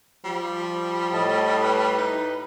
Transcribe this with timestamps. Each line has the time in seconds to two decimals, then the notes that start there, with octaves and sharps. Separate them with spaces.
0.24 F3 G3
1.13 A2 D#5 A5
1.62 B4
1.98 D#4